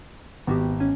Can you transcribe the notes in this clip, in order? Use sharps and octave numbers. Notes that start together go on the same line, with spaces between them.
G#1 B3 F#4 G4
C#4 G#5